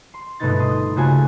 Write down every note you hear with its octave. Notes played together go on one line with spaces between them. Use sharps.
C6
G1 B2 A3 B3 D#4 A6
C6 D#6
C#3 A3 F4 F#4 C5 G#5